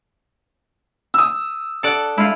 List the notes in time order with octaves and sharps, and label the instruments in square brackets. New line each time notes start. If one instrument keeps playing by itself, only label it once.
[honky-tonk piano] D#6 E6
[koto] A4 D5 F#5
[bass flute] G#3 [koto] E4 F4